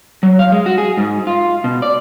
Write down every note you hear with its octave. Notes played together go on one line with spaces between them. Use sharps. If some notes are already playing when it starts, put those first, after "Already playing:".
F#3
F5
G#3
F#4
G#4
G#2
F4
B2
D5